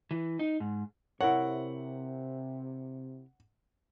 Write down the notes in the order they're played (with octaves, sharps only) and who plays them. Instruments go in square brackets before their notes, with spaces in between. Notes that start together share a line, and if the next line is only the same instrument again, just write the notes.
[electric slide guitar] E3
D#4
G#2
[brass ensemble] C3 [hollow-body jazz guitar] E4 A#4 C#5 [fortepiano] F#5